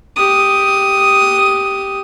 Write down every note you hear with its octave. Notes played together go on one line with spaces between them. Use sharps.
G4 D#6